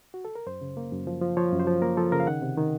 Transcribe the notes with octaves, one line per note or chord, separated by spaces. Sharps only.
F#4
A4
A#4
F#2 C5
C#3
A#3
F#2
F3
F3
F3 C#5
F#2
C5
F3
A#3 A#4
F3 A4
C#3 A#4
F5
D#3 F#5
C3
D#3